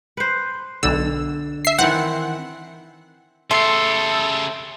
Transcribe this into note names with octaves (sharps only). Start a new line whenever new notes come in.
B4 C5
B1 D3 E6
E5 C7
D#3 E3 C4 F#5
C#3 A3 G4 A4 C6 C7